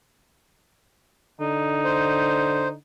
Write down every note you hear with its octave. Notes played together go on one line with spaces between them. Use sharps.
D3 D#4
C5